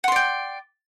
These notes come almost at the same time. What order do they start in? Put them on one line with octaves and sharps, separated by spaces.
F#5 C6 D5 G5